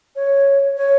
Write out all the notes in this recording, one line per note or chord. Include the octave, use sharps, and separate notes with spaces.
C#5
C#5